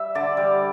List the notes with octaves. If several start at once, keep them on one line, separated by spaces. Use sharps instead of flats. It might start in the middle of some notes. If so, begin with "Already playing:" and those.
Already playing: G3 E5
D3 D5
G3